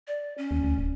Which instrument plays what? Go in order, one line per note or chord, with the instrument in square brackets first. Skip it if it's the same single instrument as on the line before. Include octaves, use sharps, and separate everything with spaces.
[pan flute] D5
C#4
[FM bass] D#2
D2
D1